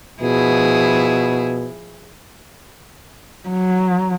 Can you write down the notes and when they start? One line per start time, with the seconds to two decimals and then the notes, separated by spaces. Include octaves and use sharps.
0.22 B2 F3 E4 G#4
3.49 F#3